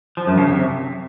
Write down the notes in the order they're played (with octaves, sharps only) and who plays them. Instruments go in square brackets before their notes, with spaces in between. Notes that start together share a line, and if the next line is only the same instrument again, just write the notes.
[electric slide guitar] F3
F#2
C#3
C3